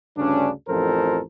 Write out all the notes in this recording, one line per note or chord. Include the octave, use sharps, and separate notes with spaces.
D2 G2 C#3 C#4 D4
A1 F2 F3 A4 A#4 C5